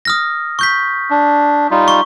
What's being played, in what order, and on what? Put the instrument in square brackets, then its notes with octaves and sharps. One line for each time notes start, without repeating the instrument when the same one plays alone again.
[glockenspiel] D#6 F6 A#6
C#6 G6 B6
[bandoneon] D4
G3 D#4 F4
[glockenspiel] C#6